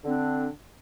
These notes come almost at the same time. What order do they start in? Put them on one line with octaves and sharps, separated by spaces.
D3 C4 D4